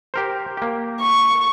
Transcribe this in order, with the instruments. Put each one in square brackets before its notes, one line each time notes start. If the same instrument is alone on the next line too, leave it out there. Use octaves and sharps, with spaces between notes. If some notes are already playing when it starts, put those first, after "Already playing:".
[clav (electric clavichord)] G4 A#4 C5
A#3 G4
[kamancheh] C#6